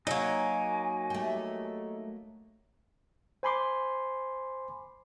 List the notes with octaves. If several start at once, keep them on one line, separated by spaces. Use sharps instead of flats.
F#3 A#3 D#4 C#5 G#5
A3 G4
C5 G#5 B5 C6 D6